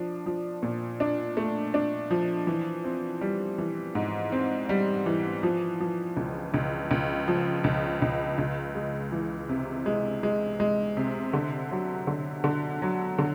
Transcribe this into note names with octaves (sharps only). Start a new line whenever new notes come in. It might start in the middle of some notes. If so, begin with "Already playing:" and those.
Already playing: F3 D4
F3
A#2
D4
A3
D4
F3
E3
C4
G3
E3
G#2
C4
G3
E3
F3
F3
C#2
C#2
C#2
F3
C#2
C#2
C#2
G#3
E3
C3
G#3
G#3
G#3
C3
D3
F#3
D3
D3
F#3
D3